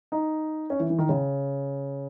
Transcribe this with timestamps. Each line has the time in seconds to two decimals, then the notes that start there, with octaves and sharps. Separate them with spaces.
0.12 D#4
0.70 C#4
0.80 E3
0.90 E3
0.99 D#3
1.09 C#3